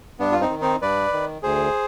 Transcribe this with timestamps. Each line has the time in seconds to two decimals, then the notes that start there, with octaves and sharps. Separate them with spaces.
0.19 G2 B3 D4
0.32 F4
0.40 C4 D#4
0.50 D#3
0.61 C4 D#4
0.82 G2 B4 D5
1.13 D#3
1.43 D2 G#4 C5